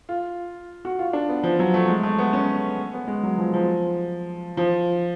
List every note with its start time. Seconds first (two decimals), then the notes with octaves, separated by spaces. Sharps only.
0.09 F4
0.85 F#4
0.99 F4
1.13 D4
1.29 B3
1.43 F3
1.59 F#3
1.74 A3
1.88 G#3
2.03 A3
2.18 B3
2.33 C#4
2.94 B3
3.08 G#3
3.23 F#3
3.38 F3
3.54 F3
4.57 F3